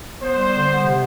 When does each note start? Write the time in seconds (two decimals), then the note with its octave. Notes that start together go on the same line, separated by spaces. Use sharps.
0.21 B3 C5
0.37 G3
0.53 D3
0.68 B3
0.84 C3